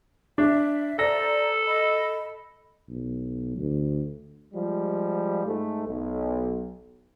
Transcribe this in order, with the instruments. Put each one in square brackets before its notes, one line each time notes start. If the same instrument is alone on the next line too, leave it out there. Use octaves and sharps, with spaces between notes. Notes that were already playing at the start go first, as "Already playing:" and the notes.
[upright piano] D4 [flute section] E5
[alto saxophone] A4 [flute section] C5 D5 A#5 [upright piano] A#6
[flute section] D#5 B5
[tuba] B1
D2
[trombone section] F3 G3 G#3
G#2 A3
B1